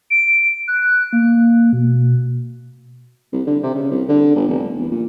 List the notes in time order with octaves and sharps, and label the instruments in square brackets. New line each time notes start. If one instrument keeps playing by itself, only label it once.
[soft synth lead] D7
F#6
A#3
B2
[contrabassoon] C2
D3
C3
C#3
C2
D3
G1
F1
G1
E2
A#2